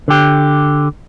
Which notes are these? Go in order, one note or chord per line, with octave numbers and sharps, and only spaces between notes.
D3 G4